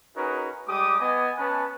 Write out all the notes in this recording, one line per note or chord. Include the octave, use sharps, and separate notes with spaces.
C#4 D#4 F#4 G#4 A#4 B4
G3 G#3 G4 D6 D#6
B3 D#5 G#5
B3 C#4 B4 G#5 A5